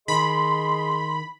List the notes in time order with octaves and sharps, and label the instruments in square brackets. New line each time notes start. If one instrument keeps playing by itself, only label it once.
[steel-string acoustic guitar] D#3 [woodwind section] G#4 D#5 C6 [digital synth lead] B5